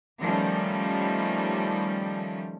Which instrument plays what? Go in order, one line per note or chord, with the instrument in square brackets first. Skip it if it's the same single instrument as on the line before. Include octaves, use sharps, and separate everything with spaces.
[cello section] D#3 F3 G3 A3 C#4